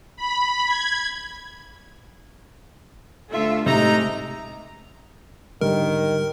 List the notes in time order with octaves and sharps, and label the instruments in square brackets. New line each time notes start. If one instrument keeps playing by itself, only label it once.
[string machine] B5
G#6
[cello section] D2 F4 A4 [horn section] E5
[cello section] A2 G#3 A3 [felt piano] C3 [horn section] D#4 A#5
[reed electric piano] G#2 D3 G3 [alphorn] D#3 [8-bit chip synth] A#4